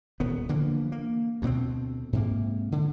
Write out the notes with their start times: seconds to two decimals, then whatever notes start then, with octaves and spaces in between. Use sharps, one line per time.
0.20 D#1 D#3 B3
0.49 D3 E3 F3 A#3
0.92 A#3
1.42 D2 B2 B3 C4
2.13 G#2 C3 A#3
2.72 D3